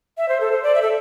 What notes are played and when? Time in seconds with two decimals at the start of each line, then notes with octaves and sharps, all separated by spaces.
0.17 E5
0.29 C5
0.40 A4
0.52 C5
0.63 D5
0.75 E5
0.82 A4